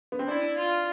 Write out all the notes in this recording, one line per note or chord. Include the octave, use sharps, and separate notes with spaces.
B3
C4
D4 E4
F4